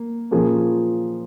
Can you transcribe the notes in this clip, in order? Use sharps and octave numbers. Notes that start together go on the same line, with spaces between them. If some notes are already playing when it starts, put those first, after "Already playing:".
Already playing: A#3
A#2 F3 A#3 C#4 G#4